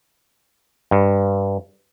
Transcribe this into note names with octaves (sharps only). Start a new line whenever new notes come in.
G2